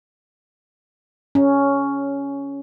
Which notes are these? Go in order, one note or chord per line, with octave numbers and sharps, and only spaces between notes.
C#4